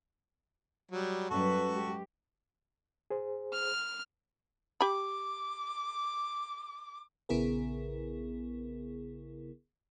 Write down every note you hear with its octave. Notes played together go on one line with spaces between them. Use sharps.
F#3 G3
F#2 G3 F#4 A4 B4 C#6
G#3 G4
G#4 C5
F6
G4 B5 D6
A#1 C#3 B3 E4 G#4 A#4